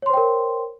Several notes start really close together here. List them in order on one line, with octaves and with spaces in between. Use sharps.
C#5 C6 C5 G5 A#4